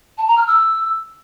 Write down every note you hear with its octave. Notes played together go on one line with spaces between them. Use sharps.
A5
A#5
F6
E6